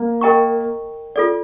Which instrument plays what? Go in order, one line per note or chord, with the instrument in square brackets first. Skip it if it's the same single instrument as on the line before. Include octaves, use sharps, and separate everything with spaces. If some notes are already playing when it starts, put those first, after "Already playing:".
Already playing: [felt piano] A#3
[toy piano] A#4 D#5 G5 A#5 C#6
F4 A4 D5